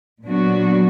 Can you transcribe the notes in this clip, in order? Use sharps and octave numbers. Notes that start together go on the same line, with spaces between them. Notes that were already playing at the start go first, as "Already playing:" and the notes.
A#2 F#3 B3 D4 F#4